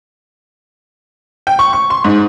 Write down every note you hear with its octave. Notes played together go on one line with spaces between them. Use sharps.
G5
C#6
C#6
C6
G#2